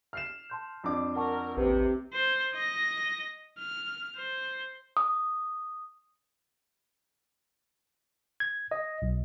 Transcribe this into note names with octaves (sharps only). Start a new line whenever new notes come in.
F6 C7 E7
A5 C6 G6
F2 D4 D6
A#4 F#5 A5 C#6
A1 D#2 C3 G4 B4 C5
C5
D#5 A#6
F6
C5
D#6
G#6
D#5
B1